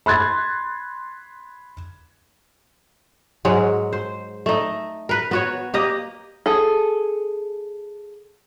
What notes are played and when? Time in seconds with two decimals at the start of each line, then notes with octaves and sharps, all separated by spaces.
0.06 B5 C6 F#6 G#6 A6
3.45 G#2 F#3 G#3
3.93 C5
4.46 A3 D#4
5.09 A#4 B4
5.31 B3 F#4 C#5
5.74 A#3 G4 D#5
6.46 G#4 A4